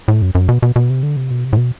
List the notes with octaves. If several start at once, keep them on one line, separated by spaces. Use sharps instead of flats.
A2
F#2
F#2
B2
B2
B2
C3
D3
C3
B2
C3
A2
B2